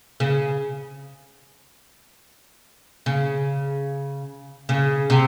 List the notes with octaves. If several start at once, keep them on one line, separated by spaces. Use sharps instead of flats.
C#3
C#3
C#3
C3